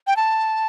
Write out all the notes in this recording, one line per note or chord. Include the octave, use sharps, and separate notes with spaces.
G5
A5